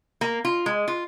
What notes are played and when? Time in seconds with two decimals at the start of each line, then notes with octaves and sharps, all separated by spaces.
0.21 A#3
0.45 F4
0.66 G#3
0.88 F4